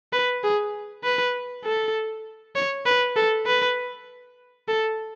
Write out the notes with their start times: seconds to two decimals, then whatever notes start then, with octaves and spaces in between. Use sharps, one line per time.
0.13 B4
0.44 G#4
1.04 B4
1.64 A4
2.55 C#5
2.86 B4
3.16 A4
3.46 B4
4.68 A4